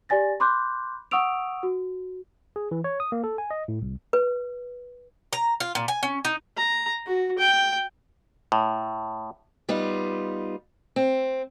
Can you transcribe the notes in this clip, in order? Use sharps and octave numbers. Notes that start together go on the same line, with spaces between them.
G4 D5 G#5 A6 A#6
B5 C6 D6 F#6 G6
F#5 C#6 D#6 E6 D7 F7
F#4
G#4
E3
C#5
D#6
A#3
A4
G#5
D#5
A2
C2
B4
A#5
F4
A#2
G#5
C#4
D#4
A#5
F#4
G5
A2
G3 B3 D#4 F4
C4